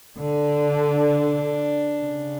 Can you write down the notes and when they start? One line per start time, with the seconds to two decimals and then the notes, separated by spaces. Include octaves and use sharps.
0.19 D3 D4
2.03 C#3